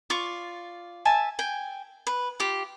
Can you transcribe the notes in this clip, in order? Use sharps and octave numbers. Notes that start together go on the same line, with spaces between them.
F4 D5 C#6
E5 G#5 A5
G5 G#5
B4
F4 G4